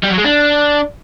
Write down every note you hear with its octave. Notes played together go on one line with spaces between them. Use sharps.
G3
F#3
G#3
D4